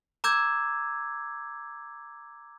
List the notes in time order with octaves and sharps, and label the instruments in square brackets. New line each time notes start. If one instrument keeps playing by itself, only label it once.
[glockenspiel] A#5 D6 E6 G6 G#6